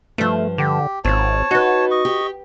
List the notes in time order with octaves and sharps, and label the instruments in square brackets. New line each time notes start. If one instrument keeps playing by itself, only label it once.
[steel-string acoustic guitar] G2 F3 [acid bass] A3
[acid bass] D3 [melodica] G4
[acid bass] G#1 [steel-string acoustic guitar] C4 F4 [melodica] C#5 A5
[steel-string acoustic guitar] D#4 B4 [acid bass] F#4
[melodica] D#5 C#6
[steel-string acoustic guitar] G4